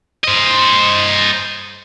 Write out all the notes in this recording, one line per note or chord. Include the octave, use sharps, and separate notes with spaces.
C5 D#5